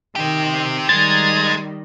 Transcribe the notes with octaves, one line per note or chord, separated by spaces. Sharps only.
D#3 C4 G4
D#3 G3 G#3 A#5 G#6 A6